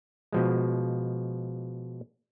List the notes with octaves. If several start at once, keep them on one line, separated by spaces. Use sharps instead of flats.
B2 F3 G#3